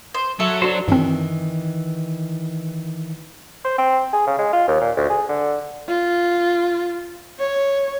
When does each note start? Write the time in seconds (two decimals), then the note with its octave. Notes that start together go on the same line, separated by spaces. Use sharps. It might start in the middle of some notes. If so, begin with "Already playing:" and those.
0.14 C5
0.40 F#3 A4 E5
0.62 D4 F#4 C5
0.88 G2 D#3 E3 C4
3.65 C5
3.78 C4
4.13 G#4
4.27 C#3
4.38 G#3
4.53 F4
4.68 D#2
4.81 A#2
4.97 D2
5.10 G#4
5.29 D3
5.88 F4
7.40 C#5